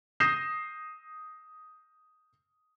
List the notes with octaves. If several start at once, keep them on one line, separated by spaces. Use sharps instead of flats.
D#6 G6 A#6 C7 E7